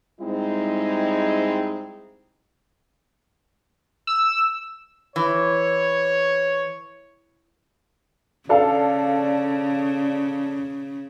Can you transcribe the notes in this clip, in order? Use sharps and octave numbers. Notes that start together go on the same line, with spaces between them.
G#2 G3 G#3 C4 D#4 E4
E6
E3 C#5
C#3 D4 A4 F5